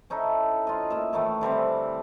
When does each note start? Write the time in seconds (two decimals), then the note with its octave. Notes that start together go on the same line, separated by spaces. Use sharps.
0.10 C#4 D#4 E4 A4
0.67 F4 D#5
0.90 A#2 E5
1.13 A2 D#3 E3 A3
1.41 D3 E3 G3 C4